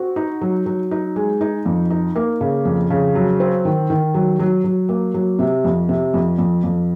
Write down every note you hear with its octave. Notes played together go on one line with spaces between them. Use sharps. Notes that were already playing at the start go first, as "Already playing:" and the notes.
Already playing: C4 F#4
D#4
F#3
F#3
D#4
G#3
D#4
F2
D#4
A#3
C#3
F2
C#3
F#3
C4
D#3
D#3
F#3
F#3
F#3
A#3
F#3
C3
F2
C3
F2
F2
F2